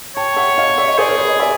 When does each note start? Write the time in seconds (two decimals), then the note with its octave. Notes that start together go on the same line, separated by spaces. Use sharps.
0.17 C#5 G5 A5
0.36 E5 F#5
0.58 D#5 F5
0.78 D5 E5
0.88 D#5
0.98 G#4 C5 D5
1.08 A#4 C5
1.18 B4 C#5
1.29 C#5 D#5
1.40 D5 E5